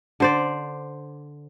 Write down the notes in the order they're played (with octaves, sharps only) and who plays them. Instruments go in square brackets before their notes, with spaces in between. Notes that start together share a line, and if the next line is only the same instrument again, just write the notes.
[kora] D3 C5 D5